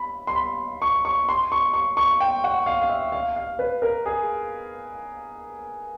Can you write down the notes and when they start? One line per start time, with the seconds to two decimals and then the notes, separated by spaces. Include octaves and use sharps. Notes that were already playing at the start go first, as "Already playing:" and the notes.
Already playing: B5
0.27 C6
0.35 B5
0.82 C#6
1.05 C#6
1.29 C6
1.52 C#6
1.74 C#6
1.97 C#6
2.20 G5
2.44 F#5
2.66 F5
2.82 F5
2.90 E5
3.12 F5
3.36 F5
3.59 B4
3.82 A#4
4.06 G#4